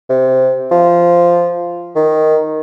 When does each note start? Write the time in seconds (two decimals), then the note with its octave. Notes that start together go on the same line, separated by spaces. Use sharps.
0.09 C3
0.71 F3
1.95 D#3